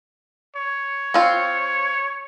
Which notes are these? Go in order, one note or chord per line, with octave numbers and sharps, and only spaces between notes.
C#5
C4 F4